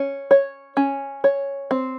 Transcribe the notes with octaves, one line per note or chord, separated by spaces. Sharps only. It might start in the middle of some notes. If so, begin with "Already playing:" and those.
Already playing: C#4
C#5
C#4
C#5
C4